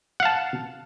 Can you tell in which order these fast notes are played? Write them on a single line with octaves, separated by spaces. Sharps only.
F#5 F5 A5